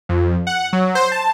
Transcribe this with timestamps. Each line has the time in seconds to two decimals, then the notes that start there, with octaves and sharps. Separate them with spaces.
0.09 F2
0.47 F#5
0.73 F#3
0.95 C5
1.12 A5